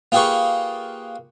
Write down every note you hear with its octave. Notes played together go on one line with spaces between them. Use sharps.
A#3 F4 G4 G#4 B4 C#6